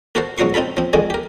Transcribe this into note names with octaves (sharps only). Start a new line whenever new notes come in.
A#3 F#4 A4 A#4 C5
C#2 F3 F#3 F#4 C6 C#6
C4 D#4 F4 A4 B5
F3 C4
F2 D3 D#3 G#3 G#5
G4 A#4